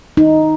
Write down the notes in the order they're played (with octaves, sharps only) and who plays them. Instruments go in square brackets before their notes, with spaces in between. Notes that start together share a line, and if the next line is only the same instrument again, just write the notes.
[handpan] D#4